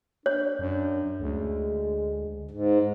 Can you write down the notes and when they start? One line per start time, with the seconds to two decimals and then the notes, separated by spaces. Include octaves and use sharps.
0.26 D4 C#5
0.59 F#2
1.20 D2 G#3
2.51 G#2